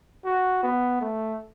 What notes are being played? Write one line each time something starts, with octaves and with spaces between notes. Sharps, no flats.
F#4
B3
A3